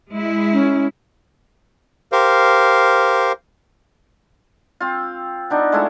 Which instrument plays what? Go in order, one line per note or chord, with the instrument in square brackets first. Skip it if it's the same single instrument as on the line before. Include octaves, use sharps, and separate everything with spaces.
[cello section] G#3 E4
[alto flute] C#4
[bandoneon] G4 A#4 C5 F5
[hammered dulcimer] C4 F4
B3 D4 D#4
G#3 A3 E4 F4